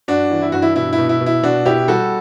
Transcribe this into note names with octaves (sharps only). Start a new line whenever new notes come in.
G2 D4 F#4
E3
E4
G2 F#4
E4
B2 E4
E4
B2
E4
B2
E4
B2 D4 F#4
B2 E4 G4
G3 F#4 A4